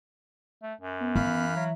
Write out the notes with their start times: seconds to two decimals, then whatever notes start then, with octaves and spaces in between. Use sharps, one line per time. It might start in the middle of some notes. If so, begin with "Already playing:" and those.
0.62 A3
0.81 F#2
1.00 B3
1.16 E3 F5 B5 F#6
1.56 F#3 E5